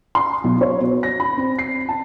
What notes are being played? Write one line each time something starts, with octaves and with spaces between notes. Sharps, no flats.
C6
B1
C#5
B2
A#6
B5
C4
C7
A5